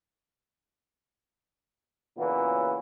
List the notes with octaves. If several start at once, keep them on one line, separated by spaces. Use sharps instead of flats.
A#2 C#3 E3 F#3 A#3 B3